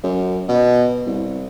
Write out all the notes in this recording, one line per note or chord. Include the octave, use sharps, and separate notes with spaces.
F#2
B2
C2